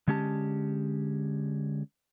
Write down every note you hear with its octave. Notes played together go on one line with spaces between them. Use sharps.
D3 G#3 C#4 G4 A5